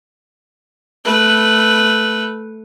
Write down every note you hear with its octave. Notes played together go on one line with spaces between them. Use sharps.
A3 B4